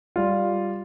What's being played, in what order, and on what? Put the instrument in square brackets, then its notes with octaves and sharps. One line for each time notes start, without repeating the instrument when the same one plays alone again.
[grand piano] G3 F4